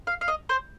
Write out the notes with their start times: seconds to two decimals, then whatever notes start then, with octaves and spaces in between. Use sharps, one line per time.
0.07 F5
0.21 F5
0.28 D#5
0.49 C5